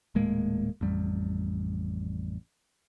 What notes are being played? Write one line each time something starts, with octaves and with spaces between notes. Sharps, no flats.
D#1 A2 G#3 A#3
A1 F2 G3